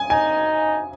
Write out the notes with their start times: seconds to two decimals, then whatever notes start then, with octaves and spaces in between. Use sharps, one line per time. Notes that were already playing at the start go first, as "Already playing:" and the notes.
Already playing: G#5
0.10 D#4 G#5